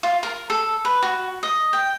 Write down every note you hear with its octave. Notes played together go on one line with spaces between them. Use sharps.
F4
A#4
A4
B4
F#4
D#5
G5